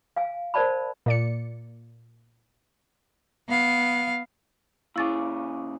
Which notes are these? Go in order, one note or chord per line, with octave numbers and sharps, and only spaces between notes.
F5 G#5
A#4 C5 D5 A5 B5
A#2 D5 C#7
B3 F5
A#2 C#3 E4 G#4 F5 C#6 D6 A6